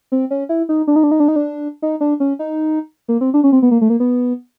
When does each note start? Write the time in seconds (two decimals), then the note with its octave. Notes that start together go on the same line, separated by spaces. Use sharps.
0.12 C4
0.31 C#4
0.49 E4
0.69 D#4
0.87 D4
0.96 D#4
1.04 D4
1.11 D#4
1.20 D4
1.28 D#4
1.36 D4
1.82 D#4
2.01 D4
2.20 C#4
2.39 D#4
3.08 A#3
3.21 C4
3.34 D4
3.44 C#4
3.52 C4
3.62 B3
3.71 A#3
3.81 A3
3.90 A#3
4.00 B3